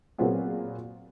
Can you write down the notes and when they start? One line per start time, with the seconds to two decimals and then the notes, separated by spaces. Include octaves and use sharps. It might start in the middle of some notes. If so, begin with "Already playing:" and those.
0.18 A#2 F#3 B3 C4 F4 G#4